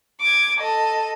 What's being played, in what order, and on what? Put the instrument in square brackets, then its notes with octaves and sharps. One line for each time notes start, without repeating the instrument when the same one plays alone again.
[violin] D6 G#6
A4 D#5